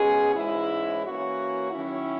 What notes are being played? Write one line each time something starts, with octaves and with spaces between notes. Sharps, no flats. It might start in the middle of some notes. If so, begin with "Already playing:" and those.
Already playing: B2 G#3 C#4 G#4
G#2 E3 G#3 C#4 E4
E3 A#3 C#4 F#4
D#3 F#3 C#4 E4